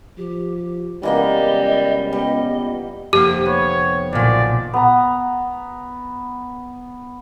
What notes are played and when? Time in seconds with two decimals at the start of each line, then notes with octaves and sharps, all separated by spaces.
0.18 F3 G4
1.03 C#2 E3 G3 A#3 B3 D#5
2.13 G3 B3 D#5
3.13 F1 A#3 G4
3.46 B3 C#5
4.13 B1 A#2 D5
4.74 B3 B4 A#5